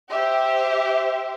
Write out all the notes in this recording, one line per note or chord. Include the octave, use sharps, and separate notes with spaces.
G4 C5 E5